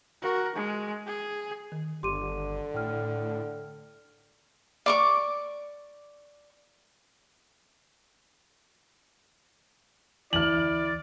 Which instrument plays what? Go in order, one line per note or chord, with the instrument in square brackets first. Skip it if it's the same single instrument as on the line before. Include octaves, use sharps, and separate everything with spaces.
[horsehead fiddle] F#4 A#4
G#3
G#4
[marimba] D#3
[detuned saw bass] G1 [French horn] D3 [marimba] G4 [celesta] C6 D6 D#7
[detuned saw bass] A2 [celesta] G5 F6
[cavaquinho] D5 C#6 D6
[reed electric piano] D2 E3 [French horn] E4 [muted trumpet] D5 [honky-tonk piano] F6 F#7